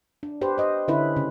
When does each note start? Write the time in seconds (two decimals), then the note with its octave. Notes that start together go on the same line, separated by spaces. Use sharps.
0.23 D4
0.41 G4 B4 C5
0.58 C5 D#5
0.88 D3 C#4 E4 B4
1.16 C#3